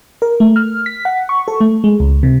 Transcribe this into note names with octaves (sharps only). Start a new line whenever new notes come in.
A#4
A3
F6
B6
F#5
C#6
A4
A3
G#3
C#2
C3